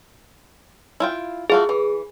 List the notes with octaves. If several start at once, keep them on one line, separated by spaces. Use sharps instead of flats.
E4 F4 G5
A3 F4 F#4 G#4
E3